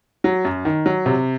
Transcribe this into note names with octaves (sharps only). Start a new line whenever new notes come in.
F#3
F#2
D#3
F#3
C3